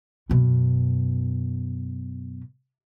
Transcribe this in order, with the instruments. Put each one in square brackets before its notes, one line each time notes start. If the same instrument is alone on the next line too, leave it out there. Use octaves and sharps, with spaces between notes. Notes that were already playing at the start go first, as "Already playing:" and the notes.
[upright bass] F#2 B2